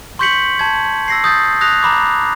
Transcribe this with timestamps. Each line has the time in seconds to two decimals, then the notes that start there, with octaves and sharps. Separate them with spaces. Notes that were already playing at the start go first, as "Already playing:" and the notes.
0.19 C6 C#6 G6 B6 C#7 F#7
0.59 A5 G#6
1.08 E6 A#6 C7
1.24 D#6 G6 A6
1.61 D#6 F#6 A#6 F7
1.83 A#5 B5 D6